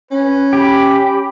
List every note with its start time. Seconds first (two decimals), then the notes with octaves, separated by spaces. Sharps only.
0.11 C#4 B4
0.53 G4 B5